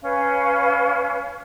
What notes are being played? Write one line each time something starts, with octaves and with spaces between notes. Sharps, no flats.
C#4 B4 F5